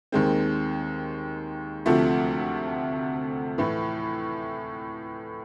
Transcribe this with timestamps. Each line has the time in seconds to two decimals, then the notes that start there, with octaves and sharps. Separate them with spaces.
0.12 D#2 D#3 G#3 C4
1.86 D2 C3 F3 A3
3.58 A2 E3 A3